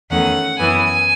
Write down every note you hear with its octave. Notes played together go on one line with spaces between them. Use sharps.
E2 D#3 A3 C#4 F#5
F#2 E3 B3 G#5